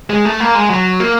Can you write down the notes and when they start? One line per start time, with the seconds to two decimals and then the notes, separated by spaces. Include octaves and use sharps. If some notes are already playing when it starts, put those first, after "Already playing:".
0.10 G#3
0.25 A3
0.40 A#3
0.55 G#3
0.70 F#3
1.00 A#3